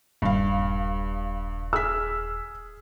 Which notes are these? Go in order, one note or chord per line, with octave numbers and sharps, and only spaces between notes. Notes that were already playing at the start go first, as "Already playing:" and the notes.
D#1 G2 F5
G#4 E6 F6 B6